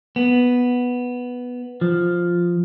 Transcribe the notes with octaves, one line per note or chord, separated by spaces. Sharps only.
B3
F3